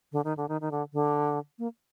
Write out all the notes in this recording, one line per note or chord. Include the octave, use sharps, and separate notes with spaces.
D3
D#3
D3
D#3
D#3
D3
D3
A#3